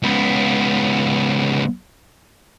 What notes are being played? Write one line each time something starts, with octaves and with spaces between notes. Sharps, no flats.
C#2 B3